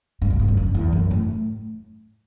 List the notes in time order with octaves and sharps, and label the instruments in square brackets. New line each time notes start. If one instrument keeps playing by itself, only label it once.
[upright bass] G2
B2
G2
F#2
D3
E2
F#2
A2